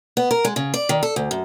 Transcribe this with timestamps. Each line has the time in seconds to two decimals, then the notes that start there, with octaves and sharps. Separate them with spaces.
0.17 B3
0.31 A#4
0.45 G#3
0.56 C#3
0.74 D5
0.89 D#3
1.03 A4
1.16 D2
1.31 F#2